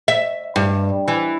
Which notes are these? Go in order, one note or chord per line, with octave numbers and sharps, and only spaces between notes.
E5
G2
E3